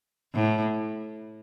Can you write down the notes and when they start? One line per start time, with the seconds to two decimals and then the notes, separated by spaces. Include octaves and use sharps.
0.34 A2